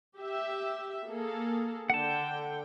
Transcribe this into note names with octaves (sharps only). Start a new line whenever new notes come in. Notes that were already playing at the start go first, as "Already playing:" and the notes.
G4 E5
A#3 G#4 A4
D3 F#5 G5 A5